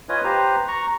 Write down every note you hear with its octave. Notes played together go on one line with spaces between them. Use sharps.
F4 B4 C#5 D#5 G#5 D#6
G4 B4 C5 A#5
A#5 C#6